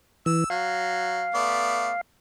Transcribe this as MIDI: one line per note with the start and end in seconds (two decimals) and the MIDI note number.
0.26 0.44 52
0.26 0.47 88
0.50 1.28 54
0.50 2.01 77
1.35 1.91 57
1.35 1.91 59
1.35 1.91 74